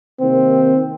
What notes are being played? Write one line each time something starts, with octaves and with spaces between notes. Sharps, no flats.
C3 D#3 A#3 C4